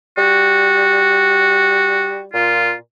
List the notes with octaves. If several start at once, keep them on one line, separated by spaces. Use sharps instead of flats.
G3 F#4
A#2 F4